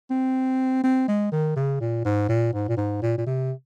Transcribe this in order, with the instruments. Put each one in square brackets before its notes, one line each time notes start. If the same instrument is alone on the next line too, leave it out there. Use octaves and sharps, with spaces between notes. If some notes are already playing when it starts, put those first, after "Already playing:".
[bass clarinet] C4
C4
G#3
D#3
C#3
A#2
G#2
A#2
G#2
A#2
G#2
A#2
A#2
C3